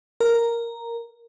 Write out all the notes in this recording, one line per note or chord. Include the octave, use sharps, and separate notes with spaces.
A#4